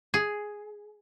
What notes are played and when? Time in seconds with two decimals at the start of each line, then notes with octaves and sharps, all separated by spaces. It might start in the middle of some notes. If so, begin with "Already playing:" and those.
0.14 G#4